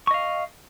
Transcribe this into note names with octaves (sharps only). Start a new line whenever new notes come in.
D#5 F5 C#6